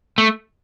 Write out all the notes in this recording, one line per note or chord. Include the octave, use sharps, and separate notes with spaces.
A3